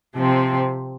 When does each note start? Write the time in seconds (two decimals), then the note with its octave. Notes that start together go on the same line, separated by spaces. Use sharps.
0.16 C3 F3 C4